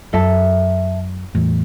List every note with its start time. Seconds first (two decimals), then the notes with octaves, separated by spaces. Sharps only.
0.13 F#2 A4 E5 A5
1.35 E2 A2